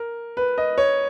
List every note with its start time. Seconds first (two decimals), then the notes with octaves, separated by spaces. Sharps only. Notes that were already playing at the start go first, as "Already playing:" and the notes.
Already playing: A#4
0.37 B4
0.58 D#5
0.78 C#5